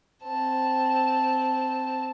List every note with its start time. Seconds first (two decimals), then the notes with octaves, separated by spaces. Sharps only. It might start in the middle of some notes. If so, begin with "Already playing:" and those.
0.23 C4 A5